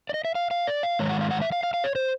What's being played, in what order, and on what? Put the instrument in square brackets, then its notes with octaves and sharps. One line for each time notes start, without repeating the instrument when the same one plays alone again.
[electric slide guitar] D5
D#5
E5
F5
F5
D5
F5
G#2 D#3 G#3 C#5
F#5
F5
F#5
E5
F5
F5
F5
C#5
C5